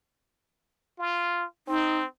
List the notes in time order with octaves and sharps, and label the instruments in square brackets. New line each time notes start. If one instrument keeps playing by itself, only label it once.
[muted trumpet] F4
[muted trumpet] C4 [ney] D#4